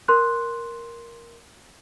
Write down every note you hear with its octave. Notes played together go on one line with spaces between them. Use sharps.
A#4 C6 F#6